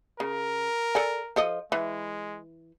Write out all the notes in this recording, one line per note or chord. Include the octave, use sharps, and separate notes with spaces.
C#3 A#4
A4 D5 G#5
F3 A4 D#5
E3 G#3